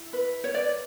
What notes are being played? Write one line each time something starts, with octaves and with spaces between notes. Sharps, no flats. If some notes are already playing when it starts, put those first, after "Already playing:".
Already playing: E4
B4
C#5
B4 D5